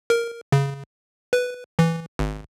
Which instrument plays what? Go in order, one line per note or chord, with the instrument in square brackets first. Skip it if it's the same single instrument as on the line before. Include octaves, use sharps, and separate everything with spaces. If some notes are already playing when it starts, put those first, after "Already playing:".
[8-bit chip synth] A#4
C#3
B4
E3
G#1